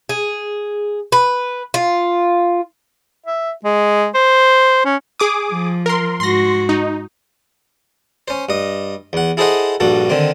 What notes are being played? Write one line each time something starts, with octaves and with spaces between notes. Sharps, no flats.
G#4
B4
F4
E5
G#3
C5
C#4
G#4 D6 D#6
F3
A#4 C6
G#2 F#4 C6 A#6
D#4
C#4 C5
G2 D#5
E2 F#5
E4 G#4 A4 C5 D#5 F#5
A#1 G2 F#4 A4
D3 D#3 C4